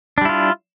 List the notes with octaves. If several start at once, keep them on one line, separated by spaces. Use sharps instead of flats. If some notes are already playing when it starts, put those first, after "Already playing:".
G3 D4 E4 F4